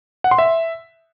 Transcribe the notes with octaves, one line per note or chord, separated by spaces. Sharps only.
F#5
C6
E5